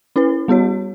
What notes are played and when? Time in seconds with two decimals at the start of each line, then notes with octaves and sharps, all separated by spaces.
0.16 C#4 E4 B4
0.48 G3 B3 F#4 C#5